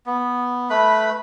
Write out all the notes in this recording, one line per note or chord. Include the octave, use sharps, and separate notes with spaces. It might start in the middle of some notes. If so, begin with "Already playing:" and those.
B3
A3 B4 B5